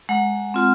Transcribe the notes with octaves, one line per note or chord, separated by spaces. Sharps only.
G#3 F#5
C4 F4